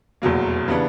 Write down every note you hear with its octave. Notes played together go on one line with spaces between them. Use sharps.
F1 E2 B2 F#3 A#3
C#3 E3 G3 B3 D4